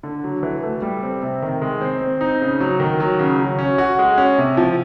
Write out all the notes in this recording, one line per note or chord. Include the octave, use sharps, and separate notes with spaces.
D3
F#3
E3
A3
G3
C4
C3
D#3
G#3
C4
C4
D#4
C#3
F#3
D#3
F#3
C#3
F#3
C#4
F#4
G#3
C#4
C3
F3